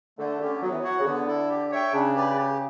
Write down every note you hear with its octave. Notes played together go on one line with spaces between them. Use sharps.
D3 A3
D3 C#4 G4
F#3 B3
E3
F#3 F#4 C#5 F#5
C#3
D3 B3
E4 A4
G4
C#5 E5 G5
C#3 D4
G4 B4 D5
G4